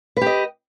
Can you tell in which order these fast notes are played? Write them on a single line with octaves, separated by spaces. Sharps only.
B4 G4 D#5